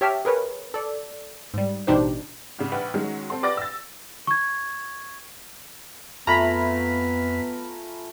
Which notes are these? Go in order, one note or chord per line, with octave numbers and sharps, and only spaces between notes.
G4 C#5 E5 G5 A5 F6
G#4 A#4 B4 C#5
A4 D5
G#2 G3
A1 B2 D4 D#4 G4 C5
G#1 C#3
A#1 B4 F#5
D#3 F#3 G#3 C#4
C4 A4 C6
B4 D5 G5 D6 A6 A#6
E6 A6
C#6 G#6
F2 A3 B3 F4 G#5 A#5 B5 B6